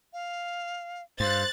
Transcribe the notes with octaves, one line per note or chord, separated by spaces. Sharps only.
F5
G2 C5 F5 F#6 A6